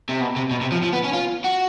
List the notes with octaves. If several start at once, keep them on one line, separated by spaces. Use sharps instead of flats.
C3
B2
C3
B2
C3
F3
F3
B3
C#4
F4
F#4